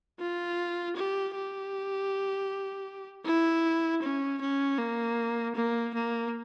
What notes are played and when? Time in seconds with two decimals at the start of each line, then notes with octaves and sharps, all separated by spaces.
0.19 F4
0.96 G4
1.35 G4
3.26 E4
4.02 C#4
4.41 C#4
4.78 A#3
5.55 A#3
5.94 A#3